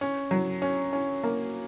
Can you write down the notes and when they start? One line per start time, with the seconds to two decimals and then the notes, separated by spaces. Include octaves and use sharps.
0.01 C#4
0.31 F#3
0.62 C#4
0.93 C#4
1.24 A#3